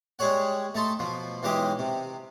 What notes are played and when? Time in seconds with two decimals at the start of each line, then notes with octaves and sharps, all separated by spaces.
0.19 G3 G#3 G#4 C#5 F#5
0.75 A3 D#4 A5 C6
0.99 B2 F3
1.43 B1 E3 G#3 G4 D#5
1.79 C3